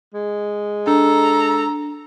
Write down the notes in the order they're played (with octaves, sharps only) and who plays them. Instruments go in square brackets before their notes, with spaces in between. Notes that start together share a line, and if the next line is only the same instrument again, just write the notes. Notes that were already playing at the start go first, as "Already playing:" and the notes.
[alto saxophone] G#3
[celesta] D4 [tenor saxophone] A4 [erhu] A#5